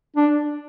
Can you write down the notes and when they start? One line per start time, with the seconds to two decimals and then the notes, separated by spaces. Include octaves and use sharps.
0.16 D4